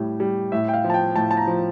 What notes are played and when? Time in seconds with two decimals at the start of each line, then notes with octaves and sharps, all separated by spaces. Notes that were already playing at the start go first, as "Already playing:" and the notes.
Already playing: A2 G3
0.20 G3
0.52 A2 E5
0.68 G5
0.74 F5
0.84 F3
0.90 A5
0.94 G5
1.16 A2 A5
1.31 A5
1.37 A#5
1.47 F3